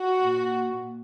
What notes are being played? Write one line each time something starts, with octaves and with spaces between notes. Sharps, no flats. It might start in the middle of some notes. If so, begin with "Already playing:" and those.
Already playing: F#4
A#2